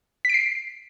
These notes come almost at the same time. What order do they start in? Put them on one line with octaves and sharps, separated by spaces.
B6 D7 C7